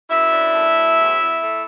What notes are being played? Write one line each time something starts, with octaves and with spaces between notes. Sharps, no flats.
F#2 E4 E5
D4
A3
F#3
E2
E2
A3